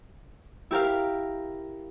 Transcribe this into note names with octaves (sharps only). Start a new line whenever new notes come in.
E4 G4 A#4 F5